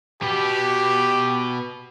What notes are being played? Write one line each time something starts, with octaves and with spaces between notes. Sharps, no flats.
B2 B3 G4